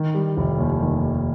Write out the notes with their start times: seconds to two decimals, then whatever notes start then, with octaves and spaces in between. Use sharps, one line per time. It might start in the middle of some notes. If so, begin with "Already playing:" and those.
Already playing: D#3
0.14 G3
0.37 F1
0.59 D#2
0.82 D#3